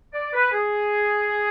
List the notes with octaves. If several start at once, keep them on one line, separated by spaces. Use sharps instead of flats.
D5
B4
G#4